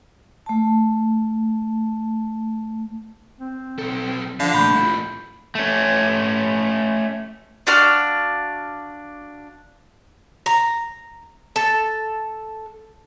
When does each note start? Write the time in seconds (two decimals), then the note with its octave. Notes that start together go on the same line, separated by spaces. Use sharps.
0.46 A3 A5
3.40 C4
3.79 B1 A4
4.40 D3 F3 F5
4.54 A#2 D#3 A3 B5 G6
4.75 A2 F3
5.55 A3 C#4
7.67 D4 F#4 F5 F6
10.46 A#5
11.56 A4